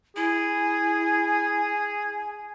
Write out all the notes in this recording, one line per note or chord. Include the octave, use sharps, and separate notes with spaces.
E4 G#4 G#5